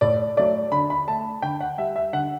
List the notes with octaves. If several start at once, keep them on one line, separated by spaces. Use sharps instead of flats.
A2 D5
F#3 A3 D5
D3 B5
B5
A3 A5
D3 G5
F#5
G3 E5
E5
D3 F#5